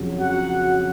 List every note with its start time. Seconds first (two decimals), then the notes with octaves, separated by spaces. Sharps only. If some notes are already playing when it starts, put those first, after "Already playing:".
Already playing: F2 C#3 F#3
0.19 F#4 F#5